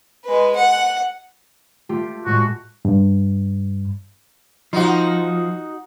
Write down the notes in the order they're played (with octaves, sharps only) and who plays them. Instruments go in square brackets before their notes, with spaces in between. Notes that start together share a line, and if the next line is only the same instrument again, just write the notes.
[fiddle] G#3 B4
F#5
[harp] A3 F4 G4
[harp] A2 G#3 [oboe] F#4
[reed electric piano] G2
[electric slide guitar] F3 [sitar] D#4 F#4